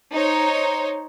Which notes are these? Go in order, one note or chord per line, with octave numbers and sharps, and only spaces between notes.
D#4 C5 C#5